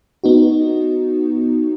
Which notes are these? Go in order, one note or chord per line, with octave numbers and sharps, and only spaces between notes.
B3 D#4 F#4